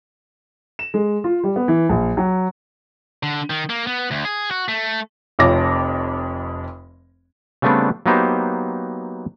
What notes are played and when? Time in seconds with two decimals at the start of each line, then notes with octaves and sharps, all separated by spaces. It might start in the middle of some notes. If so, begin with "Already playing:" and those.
0.79 E7
0.94 G#3
1.24 F4
1.44 G3
1.56 B3
1.68 E3
1.89 A#1
2.17 F#3
3.23 D3
3.50 D#3
3.70 A#3
3.87 B3
4.11 D2
4.25 G#4
4.51 F#4
4.68 A3
5.39 F1 F2 C#5 D6 A#6
7.62 C#3 G3 A3 B3 C4 D4
8.06 F#3 A#3 B3 D#4 G4 C5